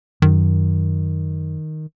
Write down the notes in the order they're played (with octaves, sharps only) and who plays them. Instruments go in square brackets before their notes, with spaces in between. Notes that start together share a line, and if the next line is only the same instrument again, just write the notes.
[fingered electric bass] F#2 [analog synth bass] D#3